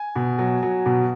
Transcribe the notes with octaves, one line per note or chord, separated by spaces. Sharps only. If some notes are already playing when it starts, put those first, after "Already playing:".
Already playing: G#5
B2
F#3
F#3
B2